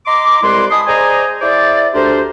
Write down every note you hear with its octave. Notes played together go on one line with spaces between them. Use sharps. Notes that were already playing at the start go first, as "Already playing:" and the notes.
D#5 A#5 C6 D6
C2 G#3 E4 B4 D5 C6
D#5 G#5 A5 B5 C6 D#6
G#4 C5 D5 D#5 G#5 A#5
E4 G#4 C5 D5
D2 D4 G4 A#4 C5